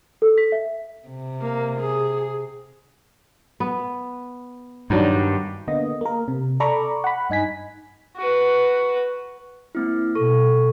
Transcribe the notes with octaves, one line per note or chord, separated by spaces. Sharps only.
A4
B6
E5
C3
A#3
G#4
B3
G2 D#3 F#3 D4
D3 A#3 B3 D#5
A#3 A#4
C3
A4 D5 A#5 B5 C#6 D6
F#5 B5
G2 D#4 G#5 B6
F#4 B4
A#3 C4 E4
B2 A4 C#6